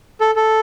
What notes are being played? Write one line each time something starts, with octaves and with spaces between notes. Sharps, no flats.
A4
A4